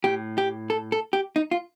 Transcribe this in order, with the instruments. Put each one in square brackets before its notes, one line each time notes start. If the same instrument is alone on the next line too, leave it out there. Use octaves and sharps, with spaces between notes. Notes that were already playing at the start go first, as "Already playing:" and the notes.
[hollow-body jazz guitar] A2 G4
G4
A4
A4
G4
D#4
F4